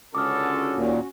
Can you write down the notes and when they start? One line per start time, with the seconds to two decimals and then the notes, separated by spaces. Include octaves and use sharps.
0.15 C#2 D3 C#4 F#4 A4 D6 D#6 F6
0.74 D#2 A#2